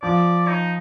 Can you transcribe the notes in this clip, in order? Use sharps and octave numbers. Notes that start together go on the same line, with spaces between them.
F3 D5
D#4